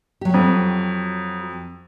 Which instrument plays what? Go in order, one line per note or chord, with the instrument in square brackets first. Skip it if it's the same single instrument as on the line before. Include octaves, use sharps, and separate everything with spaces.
[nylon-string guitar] F#3 G4
[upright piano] F2